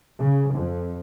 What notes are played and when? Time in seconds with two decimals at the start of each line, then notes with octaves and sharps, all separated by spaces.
0.20 C#3
0.54 F2